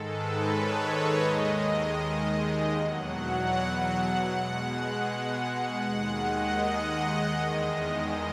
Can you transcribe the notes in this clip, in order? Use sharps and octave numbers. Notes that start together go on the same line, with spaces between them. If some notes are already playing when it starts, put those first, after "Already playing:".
Already playing: G#2 D#3 G#3 A4
B4
C#5
D#5
D#2 D#3 G#3
E2 B2 F#3 F#5
B2 G#3
D#2 D#3 G#3 F#5
D#5
E2 D#3 G#3